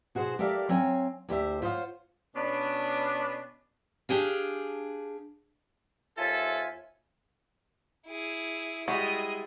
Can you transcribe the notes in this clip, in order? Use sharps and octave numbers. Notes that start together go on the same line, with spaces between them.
B2 F#4 G#4 C5
G4 A4 A#4 D5 E5 F5
F#3 C4 C#5 F5 G#5
D2 G4 C5 E5
F4 C5 C#5 D#5 F5 F#5
B2 B3 C#4 D4
D4 G4 G#4 F5
D#2 F4 A4 C5 E5 G#5
E4 G#4
G3 G#3 E4 F#4 G#4 D#5